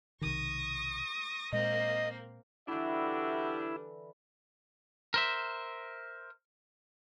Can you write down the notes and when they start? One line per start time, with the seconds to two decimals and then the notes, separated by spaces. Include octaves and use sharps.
0.21 B1 C3 D#3 C#6 D#6 A#6
1.52 A#2 G#3 A#3 C4 A#4 D#5
2.68 D3 E3 G3 D4 E4 F#4 E5
5.14 A#4 C5 E5